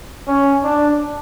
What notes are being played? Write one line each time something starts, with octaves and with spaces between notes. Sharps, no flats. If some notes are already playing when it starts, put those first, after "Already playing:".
C#4
D4